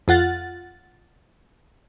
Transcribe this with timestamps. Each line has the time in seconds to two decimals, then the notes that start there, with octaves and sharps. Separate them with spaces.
0.08 F2 F4 F#5 A6